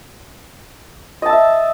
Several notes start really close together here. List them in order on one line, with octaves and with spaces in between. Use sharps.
D#5 A5 E6 E5